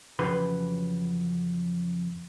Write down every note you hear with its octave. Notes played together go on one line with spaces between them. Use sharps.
F2 C#3 E3 F#3 B4 C6